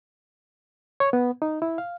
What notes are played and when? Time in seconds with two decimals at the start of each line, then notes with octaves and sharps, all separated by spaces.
1.00 C#5
1.13 B3
1.42 D#4
1.62 E4
1.78 F5